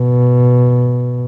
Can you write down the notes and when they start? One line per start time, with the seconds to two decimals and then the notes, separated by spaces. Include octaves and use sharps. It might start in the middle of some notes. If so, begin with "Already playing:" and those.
Already playing: B2